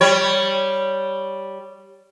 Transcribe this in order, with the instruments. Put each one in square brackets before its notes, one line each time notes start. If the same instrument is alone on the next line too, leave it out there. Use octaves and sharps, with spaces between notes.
[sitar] G3 C#5